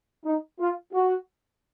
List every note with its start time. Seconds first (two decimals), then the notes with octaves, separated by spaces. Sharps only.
0.25 D#4
0.60 F4
0.93 F#4